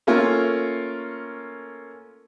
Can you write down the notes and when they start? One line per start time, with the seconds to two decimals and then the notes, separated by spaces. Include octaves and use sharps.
0.07 A3 A#3 C#4 F4 A#4